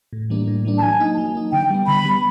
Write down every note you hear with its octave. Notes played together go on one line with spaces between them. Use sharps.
A2
E3 G3 A#3 D4
A2
E3 G3 A#3 D4
A5
F#3 G#5
A#3 D#4
F#3
A#3 D#4
D3 G5
G3 B3
D3 B5
G3 B3